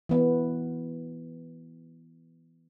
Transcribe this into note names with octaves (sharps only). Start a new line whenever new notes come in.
E3 B3